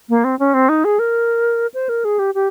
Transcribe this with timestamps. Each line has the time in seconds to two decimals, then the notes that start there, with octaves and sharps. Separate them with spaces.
0.09 A#3
0.24 C4
0.39 C#4
0.54 C4
0.69 D#4
0.84 G#4
0.99 A#4
1.74 C5
1.89 A#4
2.04 G#4
2.19 G4
2.34 G4